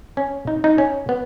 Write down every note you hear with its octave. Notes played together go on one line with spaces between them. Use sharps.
C#4
D#4
D#4
C#4
B3